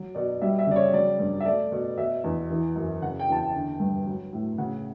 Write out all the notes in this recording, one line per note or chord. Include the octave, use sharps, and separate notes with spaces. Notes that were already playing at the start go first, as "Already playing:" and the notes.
Already playing: F#3
B2 D5
G3 E5
E5
C#3 D5
C#5
F#3 D5
G2
E5
A3 D5
B2
B2 E5
E2
E3
F#2
C#3 F#5
G5
E2 A5
G5
D3
G2
F#3
A2
C#3 F#5